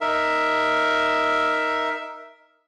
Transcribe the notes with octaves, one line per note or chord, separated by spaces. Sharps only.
D#4 A#4 E5